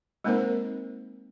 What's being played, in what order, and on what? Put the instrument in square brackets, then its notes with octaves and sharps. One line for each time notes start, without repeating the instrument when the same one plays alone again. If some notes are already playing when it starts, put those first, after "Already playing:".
[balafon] G#3 A#3 C4 D#4 A#4 C5